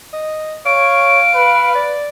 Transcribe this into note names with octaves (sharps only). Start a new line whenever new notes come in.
D#5
C#5 F5 D7
B4
D5